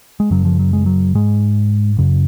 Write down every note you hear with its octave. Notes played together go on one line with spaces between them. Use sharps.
G#3
F#2 C#3 F#3
F3
F#3
G#3
F#3
G#2 G#3
F#2 C#3